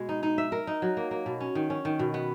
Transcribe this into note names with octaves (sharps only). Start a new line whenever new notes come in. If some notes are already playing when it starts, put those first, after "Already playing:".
Already playing: B2 G#3
D#4
D#4
E5
A#4
D#4
F#3
A#3
A#3
B2
C#4
D#3
C#4
D#3
B2
B3